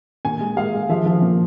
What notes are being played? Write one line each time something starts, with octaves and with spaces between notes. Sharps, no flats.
A#2 G#5
G#3
G#3 F5
G#3
F3 E5
F3
A#2